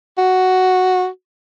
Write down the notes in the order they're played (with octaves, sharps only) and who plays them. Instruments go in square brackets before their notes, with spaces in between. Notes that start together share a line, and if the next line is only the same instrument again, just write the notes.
[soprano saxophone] F#4